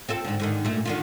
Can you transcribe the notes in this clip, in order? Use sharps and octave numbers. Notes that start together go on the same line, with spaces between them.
C4 F4 A4
G#2 D3
G#2 D3 D#3
A#2 A3
D3 D#3 F4